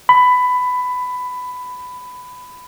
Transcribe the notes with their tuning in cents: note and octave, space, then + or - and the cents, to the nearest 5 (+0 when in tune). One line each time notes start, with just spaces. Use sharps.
B5 +15